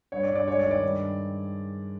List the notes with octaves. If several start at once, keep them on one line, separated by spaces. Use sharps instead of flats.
G2 C#5
D5
G2
D5
G#3 C#5
D5
D#3
D5
G2